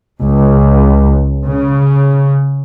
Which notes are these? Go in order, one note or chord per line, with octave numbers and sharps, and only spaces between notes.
C#2
C#3